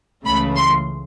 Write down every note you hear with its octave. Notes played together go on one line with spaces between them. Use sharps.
C#2 C#3 E3 A3 B5
C6